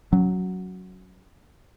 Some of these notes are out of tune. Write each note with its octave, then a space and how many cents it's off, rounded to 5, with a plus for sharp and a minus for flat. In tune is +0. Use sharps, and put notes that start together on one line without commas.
F#3 +0 C#4 +0